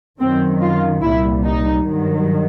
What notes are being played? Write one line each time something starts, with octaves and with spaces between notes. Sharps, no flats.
F#2 D#3 F#3 C4
F4
C2 A#2 G3 E4
D#4
G2 D#3 F#3